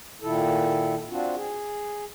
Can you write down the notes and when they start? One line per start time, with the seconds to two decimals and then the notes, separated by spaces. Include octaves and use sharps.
0.22 A#2 D#3 E4 A4
1.10 C4 D4 F4 F#4
1.35 G#4